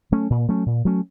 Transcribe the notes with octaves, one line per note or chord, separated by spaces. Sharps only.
F#3 A3 C#4
A#2
F#3 A3 C#4
A#2
F#3 A3 C#4